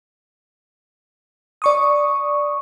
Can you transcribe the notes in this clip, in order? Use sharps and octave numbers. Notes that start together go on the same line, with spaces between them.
D5 C#6 D#6